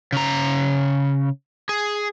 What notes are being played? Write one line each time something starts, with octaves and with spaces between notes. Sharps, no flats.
C#3 A#5
G#4